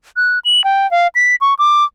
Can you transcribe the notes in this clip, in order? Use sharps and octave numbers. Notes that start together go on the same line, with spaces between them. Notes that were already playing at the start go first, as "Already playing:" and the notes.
F#6
F#7
G5
F5
B6
C#6
D6